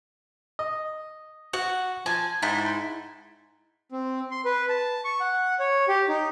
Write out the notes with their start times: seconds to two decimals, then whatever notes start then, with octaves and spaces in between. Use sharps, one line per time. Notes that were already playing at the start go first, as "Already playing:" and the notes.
0.59 D#5
1.53 F#4 F#5
2.06 F3 G#5 A5
2.42 G#2 E4
3.92 C4
4.31 C6
4.45 B4
4.69 A5
5.05 C#6
5.20 F#5
5.59 C#5
5.88 G4
6.08 D#4